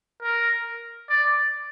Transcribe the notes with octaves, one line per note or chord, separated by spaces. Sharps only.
A#4
D5